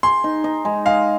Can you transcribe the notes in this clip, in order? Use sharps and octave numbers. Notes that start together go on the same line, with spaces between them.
G#4 C6
D#4
D#4
G#3
G#3 F5